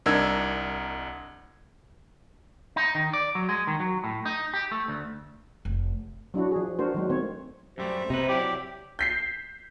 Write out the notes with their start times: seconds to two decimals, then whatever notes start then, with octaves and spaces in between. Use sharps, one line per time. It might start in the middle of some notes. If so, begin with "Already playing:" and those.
0.06 C2 D4 D#4 A#4 E6 G#6
2.76 D#4
2.95 D#3
3.13 D5
3.35 F#3
3.49 G#3
3.67 D#3
3.80 F#3
4.04 A2
4.26 D#4
4.54 G4
4.71 A3
4.88 D2
5.65 F1
6.34 F#3 D4 E4 F#4
6.51 F3 G#4
6.79 A3 D4 F#4 A#4 C5
6.94 D#3 F#3 G#3
7.10 D#3 A3 C4 C5 C#5
7.78 F#2 G3 A3 G4 C5 E5
8.10 C3 D#4 B4
8.29 F#3 E4 G4 D5
8.99 G6 B6 C7